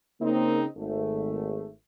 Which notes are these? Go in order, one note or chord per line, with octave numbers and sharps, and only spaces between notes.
C#3 A#3 C4 D#4
G#1 A3